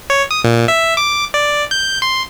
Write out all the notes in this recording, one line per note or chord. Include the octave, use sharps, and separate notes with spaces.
C#5
D#6
A#2
E5
D6
D5
G6
C6